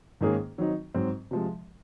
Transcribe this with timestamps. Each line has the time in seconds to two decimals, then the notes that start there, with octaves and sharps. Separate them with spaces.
0.21 G#2 D#3 A#3 C#4 G#4
0.58 D#3 F#3 C4 D#4
0.94 G#2 F#3 C4
1.31 C3 F3 G#3